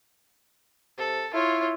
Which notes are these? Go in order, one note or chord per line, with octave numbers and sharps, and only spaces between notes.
C3 A4
E4 F4 C#5